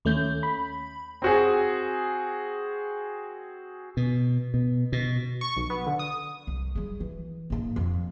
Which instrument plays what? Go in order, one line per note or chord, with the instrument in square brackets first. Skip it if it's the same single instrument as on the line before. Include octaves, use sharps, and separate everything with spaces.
[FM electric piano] D#2 A3 C#4 G6
B5
[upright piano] C4 F#4 G#4
[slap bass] B2
B2
B2
[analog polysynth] C#6
B1
B3
D3
D#6
[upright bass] C2
G3 G#3
E3
G#2 A#3
F2